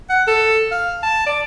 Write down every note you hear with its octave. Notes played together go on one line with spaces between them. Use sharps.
F#5
A4
F5
A5
D5